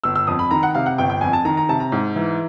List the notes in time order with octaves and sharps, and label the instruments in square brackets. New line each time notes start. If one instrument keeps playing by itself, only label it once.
[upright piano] G1 E6
E6
F2 D#6
B5
D#3 A#5
F#5
C3 F5
F#5
G1 G5
G5
F2 G#5
A5
D#3 A#5
A#5
C3 A5
A#5
G#2
E3